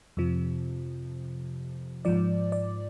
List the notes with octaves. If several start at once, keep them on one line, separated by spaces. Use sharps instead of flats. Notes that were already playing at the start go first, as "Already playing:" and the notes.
F2 C3 F3
G#2 F3 D5
D5